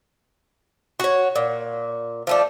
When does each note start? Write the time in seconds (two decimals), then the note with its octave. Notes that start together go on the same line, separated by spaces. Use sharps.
1.00 F#4 C#5
1.36 A#2
2.27 F3 A3 D4